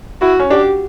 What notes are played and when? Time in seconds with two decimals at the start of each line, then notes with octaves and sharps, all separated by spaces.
0.21 E4 F#4
0.40 C#4
0.50 D4 G4